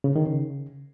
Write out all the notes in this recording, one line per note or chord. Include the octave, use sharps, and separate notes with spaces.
C#3
D#3
C#3